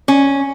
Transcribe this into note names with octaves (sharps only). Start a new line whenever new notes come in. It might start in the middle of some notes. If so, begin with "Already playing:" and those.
C#4